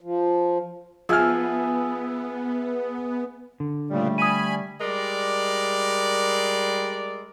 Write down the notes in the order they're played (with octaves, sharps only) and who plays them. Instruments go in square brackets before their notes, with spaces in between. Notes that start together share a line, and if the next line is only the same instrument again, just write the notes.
[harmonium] F3
[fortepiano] F3 F6 [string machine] B3 [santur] G#4 E5
[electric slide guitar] D3
[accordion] A#2 C#3 [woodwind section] G3 A3
[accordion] G#5 B5 [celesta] D#6 D#7
[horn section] G3 G#3 A#4 D5